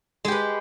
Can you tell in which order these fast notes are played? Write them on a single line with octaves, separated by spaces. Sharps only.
G#3 G4 B4